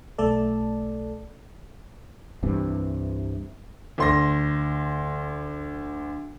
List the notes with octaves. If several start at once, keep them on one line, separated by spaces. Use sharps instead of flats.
B1 A3 A4 D5
C2 G2 C3 E3
D2 C6 A#6